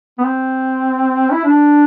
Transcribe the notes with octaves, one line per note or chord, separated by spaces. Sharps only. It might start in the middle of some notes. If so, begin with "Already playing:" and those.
B3
C4
E4
D4